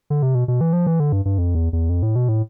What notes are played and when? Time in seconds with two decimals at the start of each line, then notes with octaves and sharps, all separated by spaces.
0.10 D3
0.23 C3
0.35 B2
0.48 B2
0.61 E3
0.73 F3
0.87 E3
1.00 D3
1.12 G2
1.25 G2
1.38 F2
1.55 E2
1.73 E2
1.89 F2
2.03 A2
2.16 B2
2.29 A2